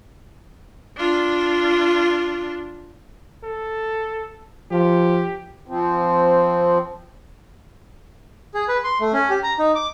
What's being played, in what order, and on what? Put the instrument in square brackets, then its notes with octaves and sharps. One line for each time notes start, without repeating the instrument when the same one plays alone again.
[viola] D4 F4
[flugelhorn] A4
[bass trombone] F3 [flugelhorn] G4
[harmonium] F3 C4
[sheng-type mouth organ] G#4
B4
C6
A3
C#4
G4
A#5
D#4
D6